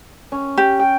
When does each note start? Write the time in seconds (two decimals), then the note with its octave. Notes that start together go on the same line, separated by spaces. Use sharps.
0.32 C#4
0.58 G4
0.79 G5